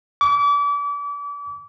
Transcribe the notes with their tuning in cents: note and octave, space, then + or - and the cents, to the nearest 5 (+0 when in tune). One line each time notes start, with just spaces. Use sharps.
D6 -35